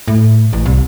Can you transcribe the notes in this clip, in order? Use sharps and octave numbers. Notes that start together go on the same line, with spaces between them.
A2
A1
C2